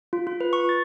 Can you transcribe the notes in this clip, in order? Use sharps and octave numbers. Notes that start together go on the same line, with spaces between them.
F4
F4
B4
C#6
A6